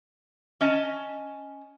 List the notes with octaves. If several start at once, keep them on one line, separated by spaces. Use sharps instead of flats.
C#4 D#5 A5